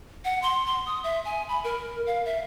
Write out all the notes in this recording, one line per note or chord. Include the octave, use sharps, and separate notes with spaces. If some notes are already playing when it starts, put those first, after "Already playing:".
F#5
C6
C6
D#6
E5
G#5
B5
A#4
F5
E5